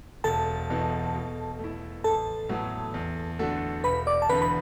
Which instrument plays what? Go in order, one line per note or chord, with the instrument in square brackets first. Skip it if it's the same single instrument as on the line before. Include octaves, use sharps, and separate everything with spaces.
[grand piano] E1 [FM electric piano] A4 A5
[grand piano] E2 B2 B3 E4
B2
A3 E4
[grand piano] A1 [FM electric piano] A4 A5
[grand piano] A2 F#3 B3 F#4
E2
D3 A3 F#4 A4
[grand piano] E1 [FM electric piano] B4 B5
[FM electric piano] D5 D6
A5
[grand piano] E2 D3 B3 [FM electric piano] B4 B5
[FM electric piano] B5